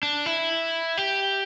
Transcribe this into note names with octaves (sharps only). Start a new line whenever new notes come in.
D4
E4
G4